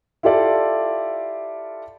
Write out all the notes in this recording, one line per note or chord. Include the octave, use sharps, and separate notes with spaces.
E4 F4 G4 A4 D5 F5